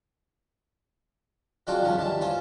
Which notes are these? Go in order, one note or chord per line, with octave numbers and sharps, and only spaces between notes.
F#3 G#3 C4 D4 F4 F#4
C#2 G2 D#3 F3 F#3 C#4
G2 E3 G#3 A5
C#4 F4 C5